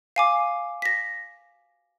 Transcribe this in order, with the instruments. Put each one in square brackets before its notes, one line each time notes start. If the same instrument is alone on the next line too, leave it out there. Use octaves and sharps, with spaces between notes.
[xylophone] F5 G#5 D6
A#6 B6